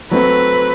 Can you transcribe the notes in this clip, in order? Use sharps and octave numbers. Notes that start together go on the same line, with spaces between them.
F#3 A3 C4 B4